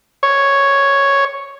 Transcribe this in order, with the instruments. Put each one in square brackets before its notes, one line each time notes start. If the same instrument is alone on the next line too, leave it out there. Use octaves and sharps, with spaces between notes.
[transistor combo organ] C#5